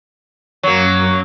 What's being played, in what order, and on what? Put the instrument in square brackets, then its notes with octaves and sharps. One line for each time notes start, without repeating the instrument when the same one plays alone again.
[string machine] F#2 [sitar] F#3 A#3